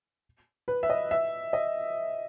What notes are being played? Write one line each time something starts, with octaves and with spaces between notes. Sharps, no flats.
B4
E5
D#5
E5
D#5